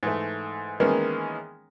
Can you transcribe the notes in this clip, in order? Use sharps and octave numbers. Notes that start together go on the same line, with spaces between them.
G#2 E3 A3
D#3 E3 G#3 A#3 B3 C#4